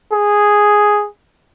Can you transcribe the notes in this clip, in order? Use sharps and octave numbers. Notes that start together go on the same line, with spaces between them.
G#4